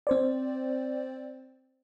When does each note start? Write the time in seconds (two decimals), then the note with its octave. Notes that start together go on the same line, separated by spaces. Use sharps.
0.07 C4 C5 D5